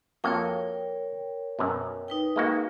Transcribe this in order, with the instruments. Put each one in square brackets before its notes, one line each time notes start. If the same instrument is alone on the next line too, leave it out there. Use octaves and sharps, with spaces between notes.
[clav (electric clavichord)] F2 A#3 F#4 [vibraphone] A#4 C#5 G5
[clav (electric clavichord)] F#2 B2
[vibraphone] D#4 B4 G5
[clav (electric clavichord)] G#3 A#3 F#4